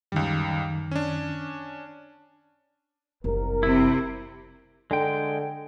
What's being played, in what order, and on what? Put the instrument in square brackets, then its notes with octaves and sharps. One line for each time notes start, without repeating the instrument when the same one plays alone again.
[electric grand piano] C#2 G3 [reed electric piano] F#2 D#3
[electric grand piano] C#4 D4
[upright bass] F#1 D4 [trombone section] C2 A#4
[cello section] C3 [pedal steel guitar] E4
[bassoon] D3 [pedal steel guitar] G#3 G5